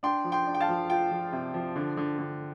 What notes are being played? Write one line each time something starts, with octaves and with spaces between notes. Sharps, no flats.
D4 G5 C6
F3
G5 C6
D4
G5
F5 A5
F3
F4 G5
F3
C3
F3
D3
D3
D3